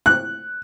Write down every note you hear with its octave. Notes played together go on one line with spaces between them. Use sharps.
F#6